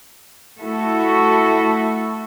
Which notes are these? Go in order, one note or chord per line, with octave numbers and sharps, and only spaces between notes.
A3 E4 F#4 A4